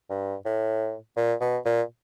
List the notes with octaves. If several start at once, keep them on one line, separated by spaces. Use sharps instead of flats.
G2
A2
A#2
B2
A#2